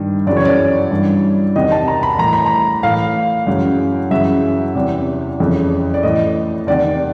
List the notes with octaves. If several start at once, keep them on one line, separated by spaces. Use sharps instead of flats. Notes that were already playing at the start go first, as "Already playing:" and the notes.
Already playing: G2 D#3
F#2 C#3 E3 D5
C#5
D5
G2 E3
E2 C3 D#3 D#5
A5
A#5
B5
A2 E3 A#5
B5
A#5
A2 E3 F5
F#2 C#3 E3
F#2 C#3 E3 E5
E2 C3 E3
F2 C#3 E3
D5
A2 E3 D#5
E2 C3 D#3 D5